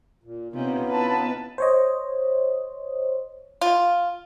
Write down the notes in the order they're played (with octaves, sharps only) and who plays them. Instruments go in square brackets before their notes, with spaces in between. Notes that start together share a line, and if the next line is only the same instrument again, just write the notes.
[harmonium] A#2
[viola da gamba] C3 [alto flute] B3 [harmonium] C#4 D#4 F4
[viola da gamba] E4 B4 [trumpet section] A5
[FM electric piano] C5 C#5 D#5
[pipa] F4